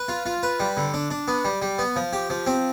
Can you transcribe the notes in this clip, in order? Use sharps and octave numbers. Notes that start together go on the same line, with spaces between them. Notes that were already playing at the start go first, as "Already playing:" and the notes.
Already playing: B4
F4
F4
B4
G3
D3
D4
D4
B3
G3
G3
B3
F3
G4
F3
C4